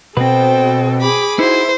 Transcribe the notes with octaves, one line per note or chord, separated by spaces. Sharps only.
B2 C4 A4 B4 C5 G5
G#4 B5 D6
D#4 E4 F#4 C5